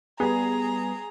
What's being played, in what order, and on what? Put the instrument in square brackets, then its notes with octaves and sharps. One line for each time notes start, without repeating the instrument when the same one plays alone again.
[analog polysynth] G3 B3 [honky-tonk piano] G#4 [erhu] A#5